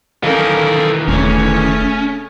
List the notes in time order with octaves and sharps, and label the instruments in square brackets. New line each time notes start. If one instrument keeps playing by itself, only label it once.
[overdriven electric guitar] D#3 E3 [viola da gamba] C#4 A#4 [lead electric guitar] A4 F5
[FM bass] E1 [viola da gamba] C#3 A3 C#5 [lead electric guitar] C#4